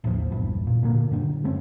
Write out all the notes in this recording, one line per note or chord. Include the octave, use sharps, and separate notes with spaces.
A1 D#2 F3
A#1 E2 G2
A#2
A#2 D3 A#3
F#2 D3
G#3 A3 C4 C#4